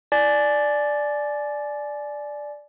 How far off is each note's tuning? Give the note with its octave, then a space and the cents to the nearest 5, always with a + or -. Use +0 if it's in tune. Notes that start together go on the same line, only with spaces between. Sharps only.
D5 +0 G#5 +30